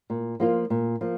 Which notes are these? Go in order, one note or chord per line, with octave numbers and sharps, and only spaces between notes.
A#2
F3 A#3 F4
A#2
F3 A#3